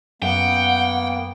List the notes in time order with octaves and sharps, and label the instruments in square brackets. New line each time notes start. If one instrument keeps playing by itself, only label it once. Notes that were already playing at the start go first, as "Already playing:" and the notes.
[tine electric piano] F#2 [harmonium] A#3 B3 [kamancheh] F#5 [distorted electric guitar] G5